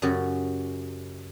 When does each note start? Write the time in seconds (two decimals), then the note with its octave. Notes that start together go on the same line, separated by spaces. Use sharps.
0.02 F#2 C#3 F#4 G4 D5